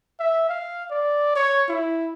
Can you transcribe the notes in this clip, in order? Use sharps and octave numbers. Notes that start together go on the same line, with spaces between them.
E5
F5
D5
C#5
E4